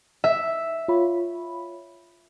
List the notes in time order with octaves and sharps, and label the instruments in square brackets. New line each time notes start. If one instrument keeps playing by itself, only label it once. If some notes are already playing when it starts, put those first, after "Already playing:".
[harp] E5
[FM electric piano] F4 C#5 B5